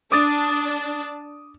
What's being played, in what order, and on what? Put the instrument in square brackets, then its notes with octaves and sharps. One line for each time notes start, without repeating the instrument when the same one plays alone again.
[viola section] D4 A5 [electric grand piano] D6 D#6 A6